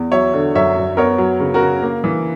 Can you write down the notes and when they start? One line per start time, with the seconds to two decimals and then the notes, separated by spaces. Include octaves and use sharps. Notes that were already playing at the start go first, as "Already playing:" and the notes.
Already playing: E2
0.12 F#3 C#5 E5
0.34 D3
0.55 F#2 C#5 E5
0.77 F#2
0.97 B3 A#4 C#5
1.18 F#3
1.40 C#3
1.54 F#4 A#4
1.62 C#3
1.82 A#3
2.04 E3